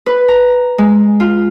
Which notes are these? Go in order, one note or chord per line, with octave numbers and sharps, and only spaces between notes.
B4
A#5
G#3
F4